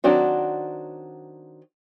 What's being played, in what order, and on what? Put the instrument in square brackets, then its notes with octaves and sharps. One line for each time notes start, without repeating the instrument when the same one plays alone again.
[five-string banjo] D#3 F#3 C4 D4 F#4